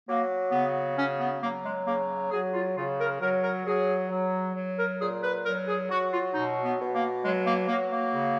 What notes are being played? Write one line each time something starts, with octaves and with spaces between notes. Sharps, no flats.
F#3 A#3
C#3 B3
F#3 C#4
B3
F#3 A#3
G#3
C#3 A#3
F#3 G#4
F4
C#3 F4
A#4
F#3 A#4
A#4
F#3 G#4
F#3
F#3
A#4
A#2 G#4
B4
F#3 A#4
G#4
F#3 F#4
F4
B2 D#4
B3
B2
A#3
F#3 G#3
A#3
F#3 A#3
A#3
C#3